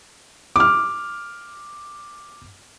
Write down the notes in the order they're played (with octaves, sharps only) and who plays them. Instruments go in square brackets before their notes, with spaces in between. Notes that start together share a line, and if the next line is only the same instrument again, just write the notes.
[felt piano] D6 F6